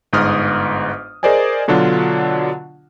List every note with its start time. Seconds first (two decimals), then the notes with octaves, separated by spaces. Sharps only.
0.13 G1 G#2 D#6 F6
1.23 G#4 A#4 C5 D5 D#5 G#5
1.68 B2 D3 F#3 D4 F4